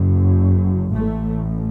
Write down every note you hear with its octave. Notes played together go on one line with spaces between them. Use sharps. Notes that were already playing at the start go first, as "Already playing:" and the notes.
Already playing: F#1 F#2
A1 A2 A3